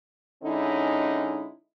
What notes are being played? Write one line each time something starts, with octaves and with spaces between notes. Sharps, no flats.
D3 G#3 C#4 D#4 E4